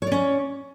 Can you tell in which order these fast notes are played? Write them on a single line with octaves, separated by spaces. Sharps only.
C#5 D5 C#4